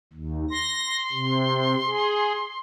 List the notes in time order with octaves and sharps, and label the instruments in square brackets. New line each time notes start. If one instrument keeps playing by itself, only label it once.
[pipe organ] D#2
[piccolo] C6 [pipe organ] A#6
[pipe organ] C3
G#4